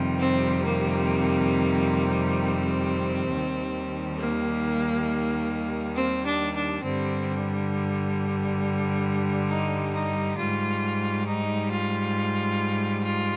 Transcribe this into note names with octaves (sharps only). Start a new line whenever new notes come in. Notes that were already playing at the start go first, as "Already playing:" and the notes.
Already playing: F2 C3 D#3 G3
C4
A#3
C4
D#2 D#3 G3
A#3
C4
D4
D4
G2 D3 G3 C4
D#4
D#4
G#2 G3 F4
D#4
F4
F4